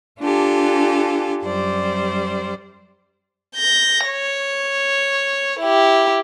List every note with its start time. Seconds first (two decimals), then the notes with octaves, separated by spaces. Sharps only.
0.21 D4 F4 G4 A4 G#5
1.44 F#2 G3 C5 D5
3.56 G6 A#6
4.06 C#5
5.60 E4 G4